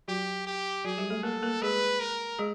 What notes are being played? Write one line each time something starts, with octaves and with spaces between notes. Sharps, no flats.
F#3 F#4 G4
G4
F#3 F#4 G#4
G3 G4
A3 A4
A#3 A4 A#4
A#3 A#4
G#3 G#4 B4
A#4
G#3 G#4